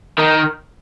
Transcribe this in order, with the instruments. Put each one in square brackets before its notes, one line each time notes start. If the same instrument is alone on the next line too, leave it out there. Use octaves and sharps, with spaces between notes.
[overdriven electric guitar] D#3